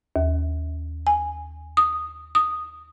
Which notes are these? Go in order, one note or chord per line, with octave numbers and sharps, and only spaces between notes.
D#2
G#5
D#6
D#6